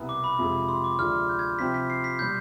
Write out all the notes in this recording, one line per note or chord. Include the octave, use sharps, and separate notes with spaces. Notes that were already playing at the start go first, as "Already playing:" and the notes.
Already playing: C2 B2 B3
D6
B5
F2 C3 F3 G#3
C6
D6
D2 C3 F3 G#3 D4 F6
G6
G#6
C3 F3 C4 G4 B6
B6
C7
B6
B2 G3 G6